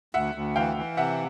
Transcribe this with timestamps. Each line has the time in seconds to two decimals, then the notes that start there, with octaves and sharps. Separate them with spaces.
0.14 D2 E5 F#5
0.35 D2
0.56 E3 F5 G5
0.77 E3
0.97 C3 E5 F#5